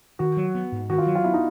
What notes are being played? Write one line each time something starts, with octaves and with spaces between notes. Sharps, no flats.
D#3 F#4
F#3
B3
G#2
D#3 F#4
F4
F#3
F4
B3 E4
D#4